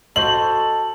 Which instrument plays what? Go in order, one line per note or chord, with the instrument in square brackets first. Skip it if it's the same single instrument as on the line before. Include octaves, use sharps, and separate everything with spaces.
[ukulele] F#4 C5 D#5 [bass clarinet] A4 [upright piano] F#7